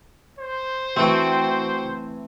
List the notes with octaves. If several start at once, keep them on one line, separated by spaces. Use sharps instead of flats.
C5
E3 A3 C4 F#4 G5